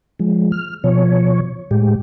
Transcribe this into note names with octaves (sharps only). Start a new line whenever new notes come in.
F3 G#3
F6
B2 F3 C#5
A2 G#3 G4